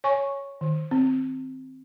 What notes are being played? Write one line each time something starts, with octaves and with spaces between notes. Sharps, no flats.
C#5 G#5 C#6
D#3
C4